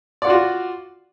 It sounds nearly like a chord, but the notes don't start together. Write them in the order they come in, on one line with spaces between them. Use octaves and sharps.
D5 F#5 F4 F#4